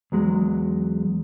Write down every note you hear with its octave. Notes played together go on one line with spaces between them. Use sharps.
E2 F#3 G#3